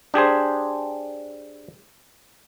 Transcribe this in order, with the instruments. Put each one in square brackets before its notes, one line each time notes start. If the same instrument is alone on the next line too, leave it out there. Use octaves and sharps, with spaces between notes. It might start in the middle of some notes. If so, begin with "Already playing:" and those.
[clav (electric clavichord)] D4 G4 G#4 C5